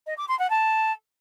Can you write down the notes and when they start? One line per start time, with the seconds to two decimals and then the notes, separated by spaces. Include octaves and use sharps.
0.07 D#5
0.18 D6
0.28 C6
0.39 F#5
0.50 A5